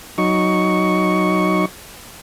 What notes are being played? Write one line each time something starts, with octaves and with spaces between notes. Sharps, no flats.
F#3 D#4 C#6